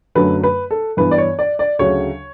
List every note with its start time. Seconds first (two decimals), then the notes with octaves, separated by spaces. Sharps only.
0.15 F#2 D3 F#3 A3 B4
0.43 B4
0.71 A4
0.97 G2 E3 B3 B4
1.11 D5
1.18 C#5
1.39 D5
1.59 D5
1.79 D2 C#3 F#3 C#5